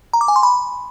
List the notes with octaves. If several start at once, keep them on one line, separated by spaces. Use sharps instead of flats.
A#5
D6
G#5
C6
B5